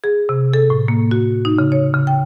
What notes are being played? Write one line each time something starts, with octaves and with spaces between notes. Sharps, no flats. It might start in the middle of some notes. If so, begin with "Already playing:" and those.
G#4
C3
A4
A2
A#3
F#4
D#4
C#3
C#5
C#3
G5